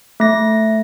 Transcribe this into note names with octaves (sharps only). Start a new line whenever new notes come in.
A3 A#6